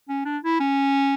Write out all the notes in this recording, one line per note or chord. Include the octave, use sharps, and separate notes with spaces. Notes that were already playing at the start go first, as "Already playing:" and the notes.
C#4
D4
E4
C#4